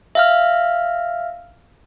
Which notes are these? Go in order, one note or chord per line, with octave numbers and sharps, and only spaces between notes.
E5 F5 F6